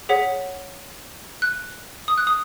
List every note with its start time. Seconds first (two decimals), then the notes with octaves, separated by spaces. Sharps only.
0.09 G#4 C#5 F#5 B6
1.42 F#6
2.08 D#6
2.18 F#6
2.27 D#6